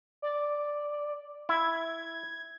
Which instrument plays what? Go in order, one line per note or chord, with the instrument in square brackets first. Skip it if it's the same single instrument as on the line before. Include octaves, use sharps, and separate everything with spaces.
[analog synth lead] D5
[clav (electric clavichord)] E4 [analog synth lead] G#6